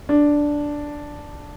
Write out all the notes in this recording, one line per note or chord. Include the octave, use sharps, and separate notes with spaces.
D4